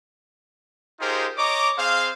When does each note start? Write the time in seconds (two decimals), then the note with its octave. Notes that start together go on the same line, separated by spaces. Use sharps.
1.00 D#4 F4 G4 G#4 A#4 C5
1.37 C#5 D#5 A#5 D6
1.78 C4 G#4 C5 F5